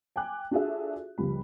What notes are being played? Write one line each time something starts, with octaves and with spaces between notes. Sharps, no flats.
G5 G#5 D6 F#6
D4 F4 F#4 G#4 A4 E5
C#2 F3 G3 B5